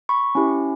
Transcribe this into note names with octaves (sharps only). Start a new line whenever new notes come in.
B5 C#6
C#4 E4 G4